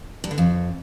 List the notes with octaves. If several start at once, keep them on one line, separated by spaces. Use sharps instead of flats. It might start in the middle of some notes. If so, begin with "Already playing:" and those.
G2
D3
F2